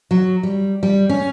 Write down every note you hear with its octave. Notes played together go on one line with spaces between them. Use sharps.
F#3
G3
G3
C#4